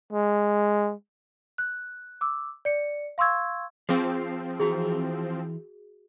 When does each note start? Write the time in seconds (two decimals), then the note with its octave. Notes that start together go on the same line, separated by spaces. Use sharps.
0.13 G#3
1.58 F#6
2.21 D6 E6
2.65 D5 C#7
3.18 F5 C6 C#6 E6 G#6
3.89 F3 C4 G#4 F5
4.60 E3 F#4 G#4 A#5